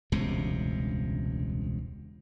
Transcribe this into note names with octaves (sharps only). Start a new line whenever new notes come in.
E1 C#2 G2 C3